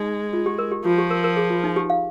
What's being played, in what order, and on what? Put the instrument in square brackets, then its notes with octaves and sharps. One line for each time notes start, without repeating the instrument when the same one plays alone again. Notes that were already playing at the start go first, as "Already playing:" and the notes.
Already playing: [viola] G#3 [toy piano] D#4
[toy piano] F4
G4
A#4
G4
[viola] F3 [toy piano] F4
[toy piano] G4
A#4
A#4
G#4
F4
D#4
G4
F5